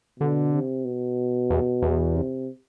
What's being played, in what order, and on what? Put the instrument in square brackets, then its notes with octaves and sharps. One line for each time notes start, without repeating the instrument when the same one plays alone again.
[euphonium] B2 [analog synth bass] D3
[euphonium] C3
B2
[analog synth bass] E2
E2
[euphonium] C3